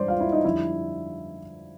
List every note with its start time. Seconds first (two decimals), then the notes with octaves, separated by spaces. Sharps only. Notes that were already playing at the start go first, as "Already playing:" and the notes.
Already playing: G2 E3 G#3 C5 D5 C6
0.08 F4 F5
0.20 E4 E5
0.32 D#4 D#5
0.45 F2 D3 G3 E4 E5